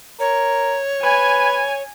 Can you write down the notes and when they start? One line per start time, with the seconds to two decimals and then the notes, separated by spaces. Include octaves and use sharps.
0.20 A#4 C#5
1.03 B4 G#5